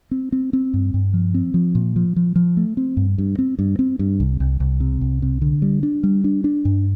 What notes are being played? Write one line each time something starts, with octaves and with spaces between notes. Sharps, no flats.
C4
C4
C4
G2
G2
F3
C4
F3
A#2
F3
F3
F3
A3
C4
G2
G2
C4
G2
C4
G2
C2
C2
C2
C3
C2
C3
D3
G3
D4
G3
D4
D4
G2